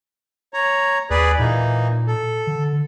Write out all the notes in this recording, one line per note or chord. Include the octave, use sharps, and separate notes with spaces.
C#5 A#5
D#2 G#4 B4 D5
A#2 E3 A#3 D#4
A4
D3